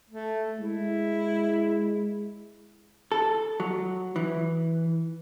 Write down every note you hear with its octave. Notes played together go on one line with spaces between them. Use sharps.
A3
G#3 E4
A4
F#3
E3